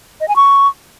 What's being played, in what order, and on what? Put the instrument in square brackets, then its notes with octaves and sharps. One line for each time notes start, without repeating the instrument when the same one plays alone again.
[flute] D#5
G#5
C#6